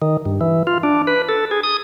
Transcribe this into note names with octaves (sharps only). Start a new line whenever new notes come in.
D#3
G2
E3
F4
D4
B4
A4
G#4
D#6